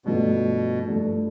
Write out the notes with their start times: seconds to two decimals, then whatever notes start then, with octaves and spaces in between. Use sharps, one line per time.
0.05 G2 B2 F3 A3
0.87 G2 F3 A3